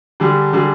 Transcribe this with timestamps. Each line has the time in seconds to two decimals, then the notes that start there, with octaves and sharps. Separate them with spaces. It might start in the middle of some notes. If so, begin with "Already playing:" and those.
0.20 D3 G3 D4 G#4
0.53 D3 G3 D4 G#4